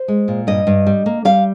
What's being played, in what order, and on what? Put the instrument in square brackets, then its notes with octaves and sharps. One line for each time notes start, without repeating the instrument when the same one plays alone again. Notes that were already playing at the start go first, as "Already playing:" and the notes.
Already playing: [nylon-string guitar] C5
G#3
A#2
G2 D#5
G2
G3
A#3
G3 F5